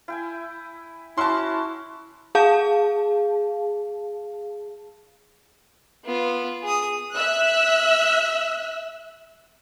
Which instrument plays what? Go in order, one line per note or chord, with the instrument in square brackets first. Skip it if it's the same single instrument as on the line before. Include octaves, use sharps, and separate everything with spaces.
[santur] E4 G5 G#5
[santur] C#4 F#4 [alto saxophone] E4 [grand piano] A5 C6
[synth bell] G#4 F5 A5
[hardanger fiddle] B3 F4
G#4 D#6
[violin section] E5 E6 F#6